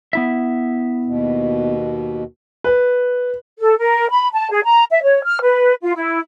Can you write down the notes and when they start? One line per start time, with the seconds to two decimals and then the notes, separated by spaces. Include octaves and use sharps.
0.13 B3 E4 E5
1.05 D#2 B2
2.64 B4
3.58 A4
3.78 A#4
4.09 B5
4.32 A5
4.51 G#4
4.65 A#5
4.90 E5
5.03 C#5
5.24 F6
5.42 B4
5.82 F4
5.96 E4